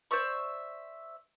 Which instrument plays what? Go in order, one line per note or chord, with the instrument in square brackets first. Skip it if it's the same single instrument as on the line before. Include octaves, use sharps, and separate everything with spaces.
[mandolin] C5 D5 E5 C#6